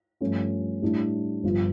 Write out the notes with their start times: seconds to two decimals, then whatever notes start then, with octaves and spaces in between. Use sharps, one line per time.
0.21 G2 F3 A3 C#4 F4
0.82 A2 G3 D4
1.44 G1 G2 F3